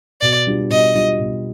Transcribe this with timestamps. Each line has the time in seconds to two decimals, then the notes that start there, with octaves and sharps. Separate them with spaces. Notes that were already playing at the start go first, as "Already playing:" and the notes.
0.21 B2 D5
0.47 G3 D4 F4
0.70 B2 D#5
0.94 G3 D4 F4
1.19 B2